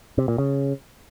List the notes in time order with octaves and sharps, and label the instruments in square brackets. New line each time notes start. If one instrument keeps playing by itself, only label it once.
[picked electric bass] C3
A#2
C#3